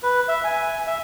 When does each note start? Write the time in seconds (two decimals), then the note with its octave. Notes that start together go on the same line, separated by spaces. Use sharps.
0.03 B4
0.28 E5
0.44 G#5
0.87 E5